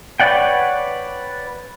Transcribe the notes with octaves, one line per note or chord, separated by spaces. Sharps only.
B4 C#5 D5 F#5 G5